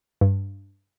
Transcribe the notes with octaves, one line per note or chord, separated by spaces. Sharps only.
G2